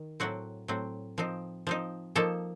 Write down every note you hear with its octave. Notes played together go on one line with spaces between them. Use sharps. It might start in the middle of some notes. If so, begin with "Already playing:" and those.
Already playing: D#3
A2 F#3 C4 F#4
A2 F#3 C4
F3 C4 D#4
F3 C4 D#4
F3 A#3 D#4 A4